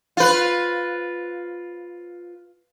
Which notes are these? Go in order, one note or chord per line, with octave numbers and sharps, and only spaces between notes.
F4 B4